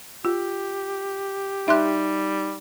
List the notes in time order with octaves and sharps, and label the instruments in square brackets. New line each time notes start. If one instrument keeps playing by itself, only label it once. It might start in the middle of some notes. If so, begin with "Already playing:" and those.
[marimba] F4 [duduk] G4
[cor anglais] G3 [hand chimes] D#4 [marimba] E5 C6 F#6